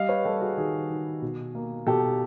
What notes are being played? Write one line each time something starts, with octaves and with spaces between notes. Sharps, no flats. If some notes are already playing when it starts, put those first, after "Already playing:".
Already playing: G3 D#5 F5
B4 C#5
G3 G4 A4
F#4 G#4
D#3 F#4 G#4
D#3
B2
A#3
B2 G4 A4